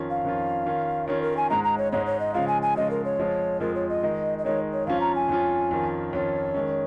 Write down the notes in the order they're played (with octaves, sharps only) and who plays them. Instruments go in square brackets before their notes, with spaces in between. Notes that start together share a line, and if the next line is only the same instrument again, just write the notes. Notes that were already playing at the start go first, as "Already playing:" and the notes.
Already playing: [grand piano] F2 D#3 C#4 F4
[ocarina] F5
[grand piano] F2 D#3 C#4 F4
D#3 C#4 F4
[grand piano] D#3 C#4 F4 [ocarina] C#5
[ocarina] A#4
G#5
[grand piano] G#2 G#3 D#4 [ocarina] A#5
[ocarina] A#5
C#5
[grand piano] G#2 G#3 D#4 [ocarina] C#5
[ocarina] C#5
D#5
[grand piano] C#3 F3 G#3 F4 [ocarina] F5
[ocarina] G#5
G#5
[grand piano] C#3 F3 G#3 F4 [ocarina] D#5
[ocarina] A#4
C#5
[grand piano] F2 F3 G#3 F4
[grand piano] F2 F3 G#3 F4 [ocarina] A#4
[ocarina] C#5
D#5
[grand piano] D#3 G#3 D#4
[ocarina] D#5
[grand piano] D#3 G#3 D#4 [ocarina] C#5
[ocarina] C#5
[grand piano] F2 F3 C#4 F4 [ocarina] F5
[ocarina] A#5
G#5
[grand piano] F2 F3 C#4 F4
F2 D#3 C#4 F4
[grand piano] F2 D#3 C#4 F4 [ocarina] C#5
[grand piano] D#3 G#3 C#4